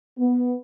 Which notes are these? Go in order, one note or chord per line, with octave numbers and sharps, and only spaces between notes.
B3